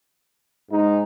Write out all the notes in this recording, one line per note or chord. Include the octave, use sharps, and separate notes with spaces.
G#2 G#3 D#4